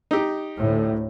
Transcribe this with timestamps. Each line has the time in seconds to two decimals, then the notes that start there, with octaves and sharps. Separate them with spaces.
0.11 D#4 G4
0.56 D2 A2